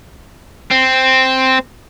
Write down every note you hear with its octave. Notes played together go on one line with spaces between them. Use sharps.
C4